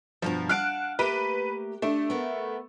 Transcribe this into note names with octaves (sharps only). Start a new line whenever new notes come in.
G2 B2 F3 A#5
F5 F#5 A5 F6 F#6 D7
A3 A#3 G4 B4
A3 D4
B3 A#4